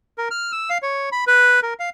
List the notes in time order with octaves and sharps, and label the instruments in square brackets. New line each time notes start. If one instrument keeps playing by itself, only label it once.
[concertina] A#4
F6
E6
F5
C#5
B5
B4
A#4
F5